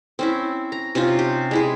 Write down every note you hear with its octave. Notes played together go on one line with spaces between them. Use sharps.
C4 C#4 E4
A#5
C3 C#4 D#4 F4
G4
G#3 E4 G#4